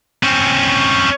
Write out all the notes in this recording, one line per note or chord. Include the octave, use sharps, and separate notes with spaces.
C4 C#4